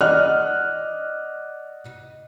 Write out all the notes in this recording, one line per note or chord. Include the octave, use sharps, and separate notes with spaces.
D5 D#5 F#5 F6 F#6